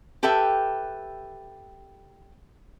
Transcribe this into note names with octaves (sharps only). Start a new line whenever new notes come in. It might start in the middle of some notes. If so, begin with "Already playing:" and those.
G4 A4 B4 E5 G5